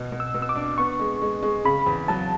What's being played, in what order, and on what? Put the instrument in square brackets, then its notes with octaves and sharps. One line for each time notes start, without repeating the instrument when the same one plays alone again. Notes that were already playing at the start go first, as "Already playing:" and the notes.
Already playing: [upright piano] B2
B2
[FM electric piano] E6
[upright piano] B2
[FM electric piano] E6
D6
[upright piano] D4
[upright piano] B3 [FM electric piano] C#6
[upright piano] G#3
G#3
G#3
[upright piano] C#3 [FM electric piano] B5
[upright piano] E2
[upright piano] F#3 [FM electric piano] A5